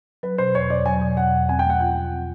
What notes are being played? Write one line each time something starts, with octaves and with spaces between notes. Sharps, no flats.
F#3 B4
B2 C5
E2 C#5
E2 D5
F#3 G#5
B2
E2 F#5
E2
C4 G#5
G5
A3
F#5
F4 G5
F3
C4